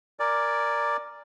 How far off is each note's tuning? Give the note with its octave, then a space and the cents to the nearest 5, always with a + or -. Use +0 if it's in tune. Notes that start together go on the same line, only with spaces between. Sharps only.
A#4 +0 D5 +0 G#5 +0